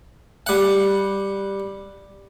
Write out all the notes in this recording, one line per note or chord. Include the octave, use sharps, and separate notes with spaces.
G3 F#5